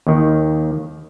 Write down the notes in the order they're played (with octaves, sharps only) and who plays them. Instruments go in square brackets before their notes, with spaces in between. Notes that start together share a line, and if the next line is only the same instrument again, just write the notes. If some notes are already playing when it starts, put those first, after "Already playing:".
[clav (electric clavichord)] D#2 D#3